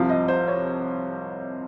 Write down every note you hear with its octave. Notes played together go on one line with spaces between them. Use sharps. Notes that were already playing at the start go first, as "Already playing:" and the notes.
Already playing: C2 C3 F3 F5
D#5
C5
C#5